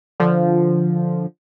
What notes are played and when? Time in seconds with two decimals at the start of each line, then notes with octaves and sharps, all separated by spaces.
0.20 D3 F3